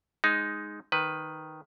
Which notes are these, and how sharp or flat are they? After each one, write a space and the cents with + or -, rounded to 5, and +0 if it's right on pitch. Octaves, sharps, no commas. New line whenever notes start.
G#3 +0 D#4 +0
D#3 +0 B4 +5